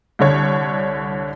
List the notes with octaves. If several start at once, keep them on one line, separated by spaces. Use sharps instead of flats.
C2 D3 C#5